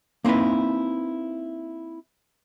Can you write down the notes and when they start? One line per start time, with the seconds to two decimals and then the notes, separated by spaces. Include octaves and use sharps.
0.24 A#3 C4 D#4 E4 B4